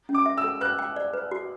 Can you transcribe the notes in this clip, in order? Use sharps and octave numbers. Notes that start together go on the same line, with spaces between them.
C#4
D6
E5
E6
A4
B4 F#6
G5
D5
B4
F#4